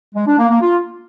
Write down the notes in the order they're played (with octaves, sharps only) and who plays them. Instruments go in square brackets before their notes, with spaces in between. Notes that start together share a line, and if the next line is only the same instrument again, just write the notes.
[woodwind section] G#3
D4
A#3
A#3
F4